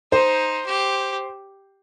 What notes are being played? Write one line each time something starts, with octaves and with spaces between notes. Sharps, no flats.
D#4 C5
G4